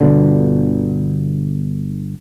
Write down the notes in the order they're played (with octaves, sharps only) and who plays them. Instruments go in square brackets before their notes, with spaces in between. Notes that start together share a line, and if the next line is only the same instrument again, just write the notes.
[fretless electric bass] G1 B2 D3